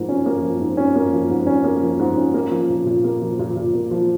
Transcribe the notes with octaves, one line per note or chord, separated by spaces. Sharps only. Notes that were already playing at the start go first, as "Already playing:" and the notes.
Already playing: G#2 F3 A#3
C#4
A#3
F3
G#2
C#4
A#3
F3
G#2
C#4
A#3
F3
G#2
C#4
A#3
F3
A#2
A#2
A#3
F3
A#2
A#2
A#3
F3